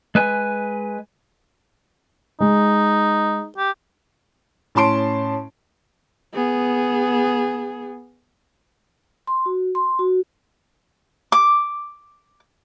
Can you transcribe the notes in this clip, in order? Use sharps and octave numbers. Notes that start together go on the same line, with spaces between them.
G#3 B4 G#5
G#3 D#4
G4
A2 C#4 A5 C6 D7
B3 G#4
C6
F#4
C6
F#4
D6